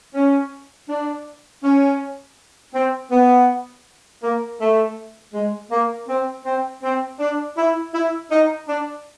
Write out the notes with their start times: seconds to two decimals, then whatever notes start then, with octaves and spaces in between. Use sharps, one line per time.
0.14 C#4
0.88 D4
1.63 C#4
2.74 C4
3.11 B3
4.22 A#3
4.60 A3
5.34 G#3
5.71 A#3
6.08 C4
6.45 C4
6.83 C4
7.19 D4
7.57 E4
7.93 E4
8.30 D#4
8.68 D4